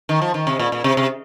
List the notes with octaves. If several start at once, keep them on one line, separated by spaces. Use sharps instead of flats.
D#3
F3
D#3
C3
A#2
A#2
C3
C3